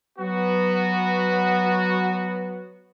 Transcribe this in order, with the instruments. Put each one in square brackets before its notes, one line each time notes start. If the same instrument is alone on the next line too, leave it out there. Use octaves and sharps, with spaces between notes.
[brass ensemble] F#3 B3 F#4